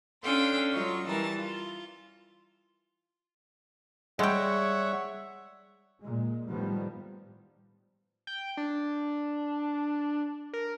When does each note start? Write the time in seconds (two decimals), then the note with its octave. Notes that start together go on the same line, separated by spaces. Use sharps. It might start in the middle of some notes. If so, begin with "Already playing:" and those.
0.23 C#4 D4 A4 F5 G5 C6
0.71 F#3 F4 D#5 C#6
1.07 E3 G3 A#4 A5
1.39 F4
4.19 G3 G#3 C#5 E5 F#5 G5
6.01 A#2 G#3
6.49 A2 D#3 F3 G3 B3
8.27 G5
8.57 D4
10.53 A#4